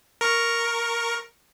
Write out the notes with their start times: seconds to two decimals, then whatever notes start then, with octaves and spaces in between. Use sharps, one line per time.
0.21 A#4 C#6